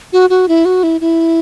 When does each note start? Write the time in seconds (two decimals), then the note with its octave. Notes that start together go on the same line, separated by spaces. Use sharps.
0.13 F#4
0.30 F#4
0.48 E4
0.65 F#4
0.83 E4
1.01 E4